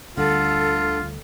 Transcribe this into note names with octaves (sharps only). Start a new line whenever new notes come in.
D2 D3 G3 F4 A4